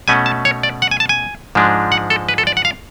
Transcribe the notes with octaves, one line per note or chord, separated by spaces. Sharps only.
B2 A3 C#4 G#5
A5
C#5
D5
F#5
G#5
A5
G#5
G#2 F3 G#3 D4
F#5
A4
B4
A4
D5
F#5
F5